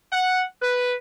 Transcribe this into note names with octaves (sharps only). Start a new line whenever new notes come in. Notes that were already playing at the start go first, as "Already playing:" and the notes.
F#5
B4